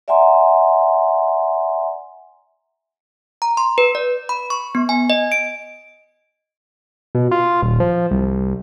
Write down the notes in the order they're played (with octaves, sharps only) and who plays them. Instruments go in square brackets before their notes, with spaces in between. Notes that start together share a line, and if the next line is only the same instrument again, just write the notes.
[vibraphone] D5 E5 F#5 G#5 A#5 C6
[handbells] A#5
C6
B4
D5
B5
C#6
B3
G#5
D#5
D7
[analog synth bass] B2
F4
D#1
F3
C2